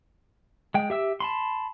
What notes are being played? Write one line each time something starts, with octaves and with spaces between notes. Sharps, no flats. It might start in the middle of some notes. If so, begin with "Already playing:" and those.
G#3 G5
G4 E5 E6
A5 B5 C6